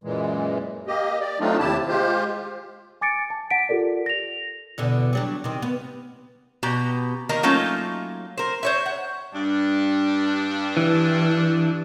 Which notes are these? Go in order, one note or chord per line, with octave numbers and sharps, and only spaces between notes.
F#2 A#2 E3 G#3
A#3 G4 D#5
D5
F#3 A3 C4 D4 D#4 F4
D#2 C3 E4 G4 A5
G#3 F4 G4 C5
G#5 D6 A6 C#7 D7
A5
F#5 B6 D7
F4 G4 A4 A#4 D5
A#6 F7
E2 B2 D3
F#3 G3 D4
C3 D#3
B3
B2 G4 A#5
D#3 A#3 A#4 D#5 A#5
F#3 A3 A#3 C#4 D#4 F4
A#4 C5
C5 C#5 E5
F#5
G2 D4
E3